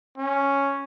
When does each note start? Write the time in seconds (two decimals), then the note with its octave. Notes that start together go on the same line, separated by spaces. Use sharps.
0.18 C#4